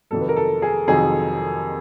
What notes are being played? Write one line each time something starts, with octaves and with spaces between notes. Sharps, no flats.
F2 C3 D#3 F#3 A4
B4
A#4
A4
G#4
F2 C3 D#3 F#3 G#4